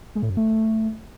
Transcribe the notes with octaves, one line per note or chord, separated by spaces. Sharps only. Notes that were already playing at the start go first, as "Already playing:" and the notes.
G#3
A2
F#2
A3